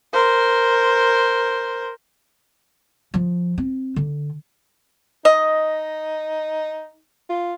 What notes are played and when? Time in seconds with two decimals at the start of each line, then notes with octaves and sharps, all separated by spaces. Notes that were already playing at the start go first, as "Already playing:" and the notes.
0.13 A#4 C5
3.14 F3
3.58 C4
3.96 D3
5.25 D#4 D#5
7.29 F4